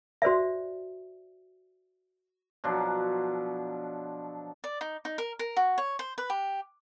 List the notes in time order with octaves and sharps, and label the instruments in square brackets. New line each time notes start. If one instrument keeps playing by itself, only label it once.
[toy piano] F#4 C5 D5 E5
[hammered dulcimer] B2 F3 F#3 D4
[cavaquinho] D5
D#4
D#4
A#4
A#4
F#4
C#5
C5
B4
G4